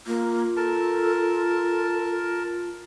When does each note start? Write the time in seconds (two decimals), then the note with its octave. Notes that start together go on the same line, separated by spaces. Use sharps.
0.07 A#3 F4
0.57 A4 A#4 A5